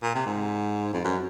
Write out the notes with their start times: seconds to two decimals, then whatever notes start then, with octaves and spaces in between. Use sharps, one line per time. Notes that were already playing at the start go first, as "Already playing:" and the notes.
0.03 A#2
0.15 C3
0.26 G#2
0.93 F2
1.04 F#2